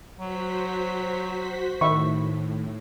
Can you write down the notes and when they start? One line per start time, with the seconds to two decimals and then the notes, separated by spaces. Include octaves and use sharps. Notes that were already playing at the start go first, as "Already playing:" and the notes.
0.18 F#3 F#4 C5 B6
1.81 A2 D#3 E5 B5 C#6